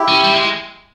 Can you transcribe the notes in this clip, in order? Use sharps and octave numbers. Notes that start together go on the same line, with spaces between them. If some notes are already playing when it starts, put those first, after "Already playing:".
Already playing: E4 G4
C#4
G3
G#3